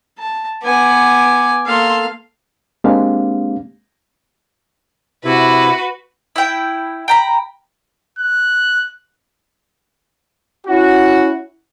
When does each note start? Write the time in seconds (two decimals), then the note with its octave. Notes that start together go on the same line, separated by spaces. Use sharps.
0.18 A5
0.64 B3 G#5 D6
1.67 A#3 A4 F5 C6
2.84 G#3 A#3 C4 D4 G4 F5
5.24 C3 E4 F#4 B4
6.36 E4 G5
7.08 G5 A#5 B5
8.19 F#6
10.67 C#4 E4 F#4